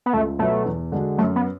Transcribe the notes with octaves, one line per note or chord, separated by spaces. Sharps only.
B3
C#2 A3
B2 F#3 A3 B3
E2
D3 G#3 D4 F#4
F#2 A3
B3